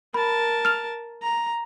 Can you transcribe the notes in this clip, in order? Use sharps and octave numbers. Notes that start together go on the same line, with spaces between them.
A#4 A5 B5
F6 F7
A#5